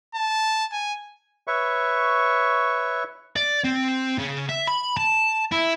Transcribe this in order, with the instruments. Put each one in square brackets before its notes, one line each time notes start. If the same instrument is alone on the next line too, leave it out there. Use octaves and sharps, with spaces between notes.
[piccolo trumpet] A5
G#5
[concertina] B4 C#5 E5 C#6
[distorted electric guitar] D5
C4
C#3
E5
B5
A5
E4